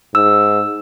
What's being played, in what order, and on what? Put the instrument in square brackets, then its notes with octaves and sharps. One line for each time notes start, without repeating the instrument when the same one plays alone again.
[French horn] G#2 [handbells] E6